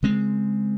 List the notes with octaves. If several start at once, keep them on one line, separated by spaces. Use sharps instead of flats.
C#3 G#3 C4